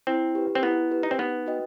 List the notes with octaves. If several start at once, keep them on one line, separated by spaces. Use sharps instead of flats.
C4 E4
G4 B4
C4
B3 E4
G4 B4
D#4
C4
B3 D#4
F#4 B4 D#5 G5